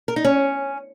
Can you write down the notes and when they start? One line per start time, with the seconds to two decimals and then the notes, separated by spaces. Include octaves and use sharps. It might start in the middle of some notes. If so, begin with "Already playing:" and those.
0.08 A#4
0.16 D#4
0.25 C#4